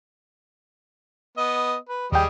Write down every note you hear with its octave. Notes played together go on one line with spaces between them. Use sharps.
B3 D#5
B4
D#2 G3 G#4 D#5 G5